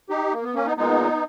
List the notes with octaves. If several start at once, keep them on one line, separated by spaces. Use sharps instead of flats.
D#4 G4
A#3
B3
A#3 C#4
B3 D#4
A#2 G#3 B3 D#4